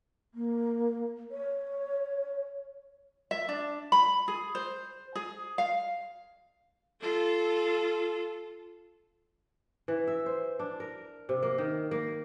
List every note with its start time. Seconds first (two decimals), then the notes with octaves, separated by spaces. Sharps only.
0.34 A#3
1.31 C#5
3.31 E5
3.49 D4
3.92 B5
4.28 G#4
4.55 C5
5.15 G#4
5.58 F5
7.00 F4 A4
9.88 E3
10.07 E5
10.26 C5
10.59 D4
10.80 A#4
11.29 C3
11.43 A#3
11.58 D#3
11.91 A#3